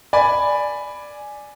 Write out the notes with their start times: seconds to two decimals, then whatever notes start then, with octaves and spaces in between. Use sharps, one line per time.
0.13 D5 G#5 B5